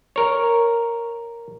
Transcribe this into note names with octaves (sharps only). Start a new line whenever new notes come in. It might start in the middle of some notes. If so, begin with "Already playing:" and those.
A#4 C#5